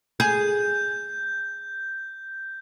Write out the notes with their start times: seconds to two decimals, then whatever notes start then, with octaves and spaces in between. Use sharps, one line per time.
0.20 G#4 G6